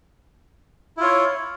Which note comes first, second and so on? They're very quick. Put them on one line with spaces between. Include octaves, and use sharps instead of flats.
E4 F4 C#5